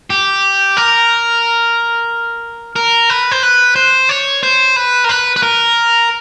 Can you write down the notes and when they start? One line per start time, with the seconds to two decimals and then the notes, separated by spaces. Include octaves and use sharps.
0.10 G4
0.77 A#4
2.76 A#4
3.10 B4
3.31 C5
3.43 B4
3.76 C5
4.09 C#5
4.43 C5
4.76 B4
5.04 A#4
5.09 B4
5.36 B4
5.43 A#4